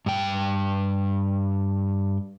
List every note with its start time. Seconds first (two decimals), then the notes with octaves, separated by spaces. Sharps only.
0.06 G2 G5